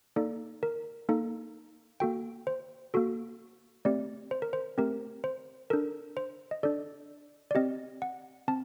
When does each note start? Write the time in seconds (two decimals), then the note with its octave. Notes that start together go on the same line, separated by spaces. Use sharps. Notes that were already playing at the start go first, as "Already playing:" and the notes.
0.16 A#3 D#4 A4 D5
0.63 A#4
1.09 A#3 D#4 A4
2.00 A#3 F#4 A4 G5
2.47 C5
2.94 A#3 F#4 A4
3.85 A3 C4 G4 D5
4.31 C5
4.42 A#4
4.53 C5
4.78 A3 C4 G4 A#4
5.24 C5
5.70 D4 A4 A#4
6.17 C5
6.51 D#5
6.63 D4 A4 D5
7.51 D5
7.55 C4 G4 D#5
8.02 F#5
8.48 C4 A5